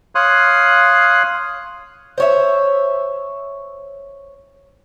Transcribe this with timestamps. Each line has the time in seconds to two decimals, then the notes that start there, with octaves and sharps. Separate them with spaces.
0.15 C#5 F5 C6 D#6 F#6
2.18 C5 C#5 E5